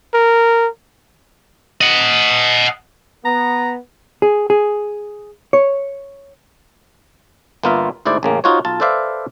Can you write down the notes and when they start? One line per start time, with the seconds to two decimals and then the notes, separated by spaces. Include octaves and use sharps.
0.14 A#4
1.81 D#5 F#5
3.25 B3 A#5
4.22 G#4
4.50 G#4
5.53 C#5
7.63 G1 A#3 B3 F4 A#4 E5
8.05 D2 G#2 E4 C5 D5
8.23 A1 C#3 A#3
8.44 D#4 F4 F#4 C5 C#5
8.65 B1 F4 A5
8.80 A4 B4 C5 D5 E5 F5